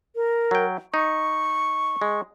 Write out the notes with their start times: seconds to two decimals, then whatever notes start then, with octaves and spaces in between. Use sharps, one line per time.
0.16 A#4
0.51 F#3 G5
0.94 D#4 C#6
2.02 G#3